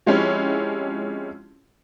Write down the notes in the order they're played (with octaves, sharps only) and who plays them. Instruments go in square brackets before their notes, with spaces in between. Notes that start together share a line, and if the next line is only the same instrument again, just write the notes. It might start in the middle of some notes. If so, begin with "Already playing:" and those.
[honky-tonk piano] F3 G#3 C4 C#4 E4 G4